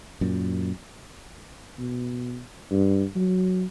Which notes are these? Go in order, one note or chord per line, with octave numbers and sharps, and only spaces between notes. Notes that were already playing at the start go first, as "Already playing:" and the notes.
F#2 A#2
B2
G2
F#3